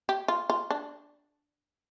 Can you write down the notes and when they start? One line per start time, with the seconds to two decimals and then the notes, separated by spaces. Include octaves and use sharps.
0.09 G4
0.28 F4
0.50 F4
0.71 D4